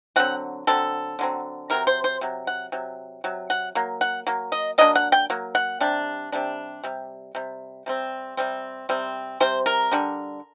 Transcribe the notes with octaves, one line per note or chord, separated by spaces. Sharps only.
D3 F#3 C4 F#5
D3 F#3 C4 A4
D3 F#3 C4
C3 F#3 C4 A#4
C5
C5
C3 F#3
F#5
C3 F#3
C3 F#3
F#5
F#3 A#3
F#5
F#3 A#3
D#5
F#3 A#3 D4 D#5
F#5
G5
F#3 A#3
F#5
C3 G3 D4
C3 G3 D4
C3 G3
C3 G3
C3 G3 C4
C3 G3 C4
C3 G3 C4
C3 G3 C4 C5
A#4
D3 G3 D4